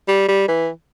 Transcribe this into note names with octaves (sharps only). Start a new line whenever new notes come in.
G3
G3
E3